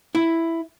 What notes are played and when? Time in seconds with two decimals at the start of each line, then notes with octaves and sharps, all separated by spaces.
0.15 E4